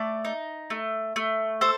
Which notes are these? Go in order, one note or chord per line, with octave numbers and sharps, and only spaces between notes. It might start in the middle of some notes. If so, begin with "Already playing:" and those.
Already playing: A3 D5
D#4
A3
A3
A4 C5